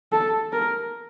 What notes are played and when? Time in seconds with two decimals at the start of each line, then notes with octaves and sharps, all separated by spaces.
0.12 A4
0.53 A#4